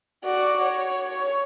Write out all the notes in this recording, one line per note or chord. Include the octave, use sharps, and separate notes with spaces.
F#4 D5
C#5
C#5